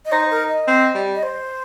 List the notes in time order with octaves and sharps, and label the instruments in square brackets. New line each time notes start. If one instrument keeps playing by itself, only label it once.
[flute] D#5
[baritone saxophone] D#4 [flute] C5
[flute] A#4
D#5
[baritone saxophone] C4
G3
[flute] D#5
C5